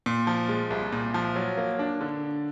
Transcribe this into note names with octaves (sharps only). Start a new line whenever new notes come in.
A#2
F3
G#3
C2
A#2
F3
F#3
A#3
D4
D3